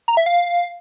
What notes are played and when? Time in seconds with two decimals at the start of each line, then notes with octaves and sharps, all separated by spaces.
0.08 A#5
0.17 E5
0.26 F5